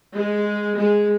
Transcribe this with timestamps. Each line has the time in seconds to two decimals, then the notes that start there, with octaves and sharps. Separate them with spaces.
0.16 G#3
0.78 G#3